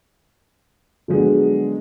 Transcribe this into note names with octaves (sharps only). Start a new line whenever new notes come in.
D3 F3 F#3 G#3 B3 D4